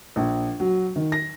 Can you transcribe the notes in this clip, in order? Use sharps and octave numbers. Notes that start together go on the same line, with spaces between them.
A#1
F#3
D#3
A#6